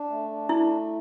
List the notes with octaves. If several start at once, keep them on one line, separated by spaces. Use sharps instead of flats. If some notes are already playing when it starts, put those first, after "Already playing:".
Already playing: D4
A3
D4
A3 E4